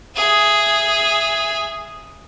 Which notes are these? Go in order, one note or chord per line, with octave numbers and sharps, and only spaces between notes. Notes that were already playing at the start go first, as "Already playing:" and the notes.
G#4 E5